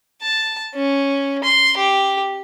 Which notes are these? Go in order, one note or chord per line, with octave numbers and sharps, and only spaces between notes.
A5
C#4
C6
G4